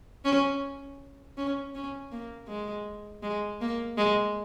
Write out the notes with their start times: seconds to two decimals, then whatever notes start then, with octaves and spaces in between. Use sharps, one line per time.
0.25 C#4
1.38 C#4
1.75 C#4
2.12 A#3
2.49 G#3
3.23 G#3
3.61 A#3
3.97 G#3